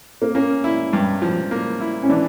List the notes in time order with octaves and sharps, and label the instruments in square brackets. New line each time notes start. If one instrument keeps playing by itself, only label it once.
[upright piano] A#3
[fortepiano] A#3 [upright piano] C#4
[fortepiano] E4
G2
F3
A#3
E4
[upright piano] C#4
[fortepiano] E3 [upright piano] D4